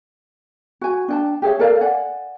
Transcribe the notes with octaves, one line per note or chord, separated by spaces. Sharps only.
F#4 G#5
D4 G5 A5
G4 G#4 C#5 E5
A4 A#4 D5 F5
D5 F#5 G#5